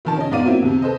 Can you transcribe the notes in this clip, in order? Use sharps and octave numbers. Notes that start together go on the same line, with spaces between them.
F1 D#3 A5
C#4 D#5
G#2 B3 D5 F5 D#7
F#3 A#3 C4 E4 F4
D#2 C3
A4 B4 C5 D#5